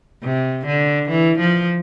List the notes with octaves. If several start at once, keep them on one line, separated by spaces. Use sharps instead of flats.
C3
D3
E3
F3